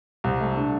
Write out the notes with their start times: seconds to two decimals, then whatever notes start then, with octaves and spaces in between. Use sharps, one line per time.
0.24 C2
0.41 A3
0.56 D4